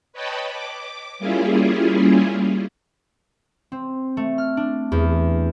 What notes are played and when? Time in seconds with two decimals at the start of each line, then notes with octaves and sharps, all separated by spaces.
0.13 B4 C#5 D#5 G5 A5 B5
0.50 D6
1.19 G3 A#3 C#4 E4 F4 G#4
3.72 C4
4.17 A3
4.38 F6
4.57 D4
4.92 E2